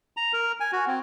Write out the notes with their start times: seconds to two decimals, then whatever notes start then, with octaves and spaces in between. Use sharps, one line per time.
0.17 A#5
0.33 A#4
0.60 G#5
0.73 F#4
0.87 C4